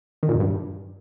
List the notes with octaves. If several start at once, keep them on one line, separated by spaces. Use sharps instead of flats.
D#3
A#2
F#2
G2